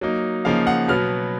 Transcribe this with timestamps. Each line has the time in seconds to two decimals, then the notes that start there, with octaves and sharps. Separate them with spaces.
0.01 F#3 A#3 D#4
0.45 C#3 F3 A#3 D#4 F5
0.67 F#5
0.88 B2 F#3 B3 F6